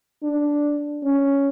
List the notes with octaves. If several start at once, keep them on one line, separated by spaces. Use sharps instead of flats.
D4
C#4